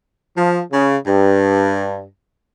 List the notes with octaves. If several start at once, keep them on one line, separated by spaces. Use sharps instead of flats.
F3
C#3
G2